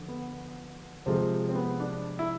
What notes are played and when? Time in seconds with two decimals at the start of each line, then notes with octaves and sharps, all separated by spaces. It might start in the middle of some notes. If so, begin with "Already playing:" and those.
Already playing: D3 F3
0.08 B3
1.06 C3 F3 G#3 C4
1.49 C4
1.56 B3
1.80 D4
2.19 E4